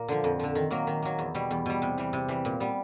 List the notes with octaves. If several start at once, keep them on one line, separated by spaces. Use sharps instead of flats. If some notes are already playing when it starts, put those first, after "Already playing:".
Already playing: A#2 A#3
D3 F3
F2
D3 F3
D#3
F#3 A#3
D#3
F#3 A#3
E2
B2 G3
E2
B2 G3
C3
E3 G3
C3
E3 G3
A#2
G3 B3